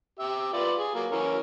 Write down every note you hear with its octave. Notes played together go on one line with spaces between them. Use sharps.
G4 E5
F4 B4 D5
G#4
F#3 A#3
E3 C#4 A#4